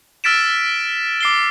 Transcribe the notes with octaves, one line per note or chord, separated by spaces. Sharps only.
E6 F6 A6 B6 D7 E7
D6 C7 G7